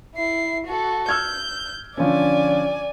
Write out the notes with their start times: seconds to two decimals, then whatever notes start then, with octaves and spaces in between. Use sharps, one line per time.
0.16 E4 C7
0.67 F#4 A4
1.09 E6 F6 G6 G#6
1.97 D3 F3 C#4 D5 G#5